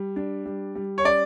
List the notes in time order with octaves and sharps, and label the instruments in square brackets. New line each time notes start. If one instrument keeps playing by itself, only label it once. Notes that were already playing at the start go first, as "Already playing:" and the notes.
Already playing: [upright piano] G3
D4
G3
G3
[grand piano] C#5
[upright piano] C#4 [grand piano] D5